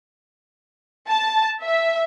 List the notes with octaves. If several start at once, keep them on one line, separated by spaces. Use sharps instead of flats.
A5
E5